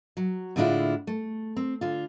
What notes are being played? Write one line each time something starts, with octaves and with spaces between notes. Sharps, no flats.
F#3
A2 D3 G#3 D4 E4 F4
A3
C4
D3 F4